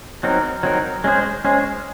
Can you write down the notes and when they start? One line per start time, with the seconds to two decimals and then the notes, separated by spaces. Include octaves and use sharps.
0.23 F#3 C4 D#4 A#4
0.63 F#3 C4 D#4 A#4
1.04 G#3 C#4 G#4 C5
1.45 G#3 C#4 G#4 C5